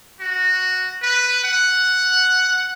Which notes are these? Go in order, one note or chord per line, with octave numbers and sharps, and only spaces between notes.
F#4
B4
F#5